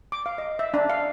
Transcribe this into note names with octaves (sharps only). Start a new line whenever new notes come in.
D6
F5
D#5
E5
D4
F5